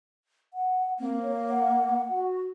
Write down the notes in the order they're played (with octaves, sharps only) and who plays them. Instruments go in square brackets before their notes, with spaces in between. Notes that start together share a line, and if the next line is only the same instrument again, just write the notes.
[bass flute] F#5
[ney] A#3 [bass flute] C4
[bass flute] C#5
F#5
[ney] F#4